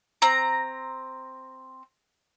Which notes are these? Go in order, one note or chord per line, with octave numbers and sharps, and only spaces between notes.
C4 A#5